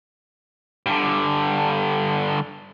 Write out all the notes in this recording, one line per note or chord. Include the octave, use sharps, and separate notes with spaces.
G2 D3